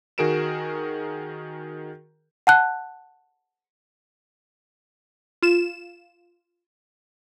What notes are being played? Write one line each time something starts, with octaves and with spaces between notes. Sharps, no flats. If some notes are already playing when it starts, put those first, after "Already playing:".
D#3 F#4 G#4 A#4 D7 E7
F#5 A5 F#6
F4 E7